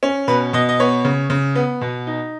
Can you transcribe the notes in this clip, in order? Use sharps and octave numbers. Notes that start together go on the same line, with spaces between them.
C#4
B2 B4
B2 D#5
D#5
B3 C#5
C#3
C#3
B3
B2
D#4